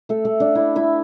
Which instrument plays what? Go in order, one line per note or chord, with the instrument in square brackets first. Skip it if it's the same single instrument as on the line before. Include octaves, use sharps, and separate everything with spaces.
[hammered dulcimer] A3 A4
A3 A4
D4 D5
E4 E5
E4 E5